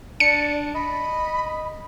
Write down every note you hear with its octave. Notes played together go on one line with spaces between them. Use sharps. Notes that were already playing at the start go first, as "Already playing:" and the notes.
D4 D5 C#7
D#5 B5